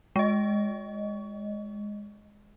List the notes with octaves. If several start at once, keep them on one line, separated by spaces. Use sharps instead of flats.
G#3 D#5